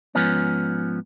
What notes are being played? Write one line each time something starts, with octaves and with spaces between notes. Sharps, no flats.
G#2 F3 B3 C#4